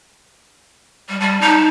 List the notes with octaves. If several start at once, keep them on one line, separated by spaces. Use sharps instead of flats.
G3
G3 A5
D#4